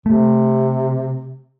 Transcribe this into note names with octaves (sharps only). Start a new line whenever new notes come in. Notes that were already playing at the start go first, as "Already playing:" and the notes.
C3 A3